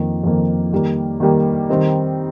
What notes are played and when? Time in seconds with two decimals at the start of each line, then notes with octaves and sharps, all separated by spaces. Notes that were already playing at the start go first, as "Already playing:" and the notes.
Already playing: F2 D#3 A#3
0.24 F2 D#3 A#3
0.72 D#3 G3 A#3
1.20 D#3 G3 A#3
1.69 D#3 G3 C4 D#4